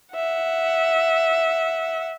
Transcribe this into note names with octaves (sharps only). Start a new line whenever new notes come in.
E5 F#5